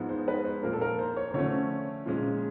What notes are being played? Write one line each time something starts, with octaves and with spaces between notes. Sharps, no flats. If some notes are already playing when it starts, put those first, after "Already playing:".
Already playing: G#2 F3 G#3 B3
C5
B4
C5
A#2 F3 A#3 A#4
A4
A#4
C5
C#5
C5
D3 F3 A3 C#4 C#5
A#2 F3 G#3 C#4